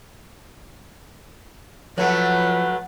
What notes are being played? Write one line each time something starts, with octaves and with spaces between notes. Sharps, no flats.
F3 F#3 A3 B4